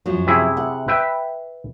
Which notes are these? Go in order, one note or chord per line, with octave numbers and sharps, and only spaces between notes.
F#2 F3 F#3
C3 E4 G#4
F#5
B4 E5 G5